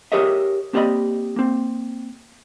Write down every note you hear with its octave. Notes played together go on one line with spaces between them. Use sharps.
G4 G#4 A#4 C#5 D#5 E5
A#3 C4 G4 D5 D#5 B5
A#3 C4